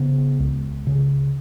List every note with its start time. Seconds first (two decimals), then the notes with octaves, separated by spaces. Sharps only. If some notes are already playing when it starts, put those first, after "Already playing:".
Already playing: C#3 B3
0.40 C#2
0.87 C#3